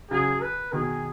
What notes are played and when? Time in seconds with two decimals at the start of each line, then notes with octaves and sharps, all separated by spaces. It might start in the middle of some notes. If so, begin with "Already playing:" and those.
0.11 C#3 F#3 G#4
0.42 B4
0.73 B2 D#3 G#4